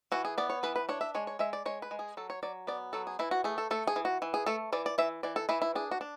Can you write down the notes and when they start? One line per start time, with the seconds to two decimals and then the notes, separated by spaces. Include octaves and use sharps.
0.12 E3 F#4
0.25 G#4
0.38 B3 D5
0.50 C#5
0.63 E3 B4
0.76 B4
0.89 D4 C#5
1.01 E5
1.15 G#3 C#5
1.27 C#5
1.39 G#3 E5
1.53 D5
1.66 G#3 C#5
1.82 B4
1.91 G#3
1.99 G#4
2.17 F#3 A4
2.30 C#5
2.43 F#3 D5
2.67 B3 D5
2.93 F#3 A4
3.07 G#4
3.19 E3 E4
3.31 F#4
3.44 A3 G#4
3.58 A4
3.71 A3 A4
3.87 G#4
3.96 E3
4.05 F#4
4.22 E3
4.34 G#4
4.46 A3 A4
4.73 E3 D5
4.86 D5
4.98 E3 E5
5.23 E3 D5
5.36 A4
5.49 E3 E4
5.62 E4
5.75 D4 G#4
5.91 F#4
6.01 D4